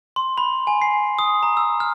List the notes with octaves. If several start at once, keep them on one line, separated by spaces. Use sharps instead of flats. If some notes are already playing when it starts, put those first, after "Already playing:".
C6
B5
G#5
C7
D#6
A#5
E6
F6